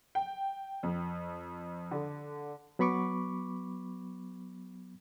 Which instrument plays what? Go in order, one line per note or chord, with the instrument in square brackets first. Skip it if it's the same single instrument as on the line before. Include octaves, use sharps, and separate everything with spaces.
[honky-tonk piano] G5
F2
D3
[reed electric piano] F#3 B3 B5 C#6 D6